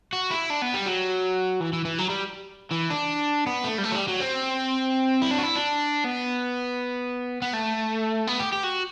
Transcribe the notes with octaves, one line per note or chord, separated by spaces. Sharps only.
F#4
E4
D4
B3
G3
F#3
E3
E3
E3
F#3
G3
E3
D4
B3
A3
G3
A3
F#3
G3
F#3
C4
E4
D4
F#4
E4
D4
B3
B3
A3
B3
G4
G4
F#4